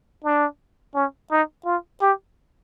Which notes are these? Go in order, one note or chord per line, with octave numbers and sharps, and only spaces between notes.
D4
C#4
D#4
F4
G4